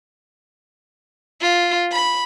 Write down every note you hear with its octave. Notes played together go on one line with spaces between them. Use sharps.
F4
B5